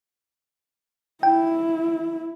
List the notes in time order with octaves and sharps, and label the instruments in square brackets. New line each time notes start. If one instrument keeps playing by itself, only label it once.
[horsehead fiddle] E4 [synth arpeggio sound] G5